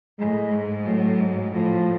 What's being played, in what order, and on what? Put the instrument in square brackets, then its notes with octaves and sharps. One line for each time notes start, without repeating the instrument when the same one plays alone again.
[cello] A2 [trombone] G#3
[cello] G#2
[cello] A2 [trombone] F#3
[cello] G#2
[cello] A2 [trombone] F3